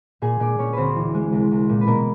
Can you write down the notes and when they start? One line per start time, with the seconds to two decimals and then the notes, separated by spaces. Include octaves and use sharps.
0.22 A#2 G#4 G#5
0.40 A#2 D4 D5
0.59 A#2 C#4 C#5
0.73 D2 C4 B4 C5
0.96 E3
1.14 G#3
1.32 C2
1.51 C2
1.69 A#2
1.81 B4
1.87 B2 A#3 A#4